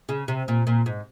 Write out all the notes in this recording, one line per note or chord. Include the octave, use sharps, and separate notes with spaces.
C#3
C3
A#2
A#2
G#2